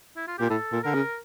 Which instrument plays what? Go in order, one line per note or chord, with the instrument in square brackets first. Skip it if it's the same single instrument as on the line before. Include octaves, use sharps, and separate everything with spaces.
[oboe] E4
F4
[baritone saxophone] A#2 [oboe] G4
[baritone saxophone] A2 [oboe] A4
[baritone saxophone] A#2
[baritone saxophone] D3 [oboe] A#4
[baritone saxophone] C#3